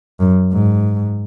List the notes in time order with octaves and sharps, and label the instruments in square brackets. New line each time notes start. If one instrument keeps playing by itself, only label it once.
[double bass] F#2
G#2